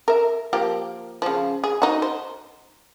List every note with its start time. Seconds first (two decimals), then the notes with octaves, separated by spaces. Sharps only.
0.08 A#4 E5
0.53 F3 A#3 G4
1.22 C#3 F3
1.64 G#4
1.82 D#4 F#4
2.02 C5